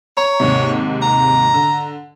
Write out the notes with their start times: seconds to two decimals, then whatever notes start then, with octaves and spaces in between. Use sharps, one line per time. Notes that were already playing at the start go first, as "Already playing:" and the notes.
0.17 C#5 A#5
0.40 D#2 G#2 C3
1.02 A#5
1.54 D3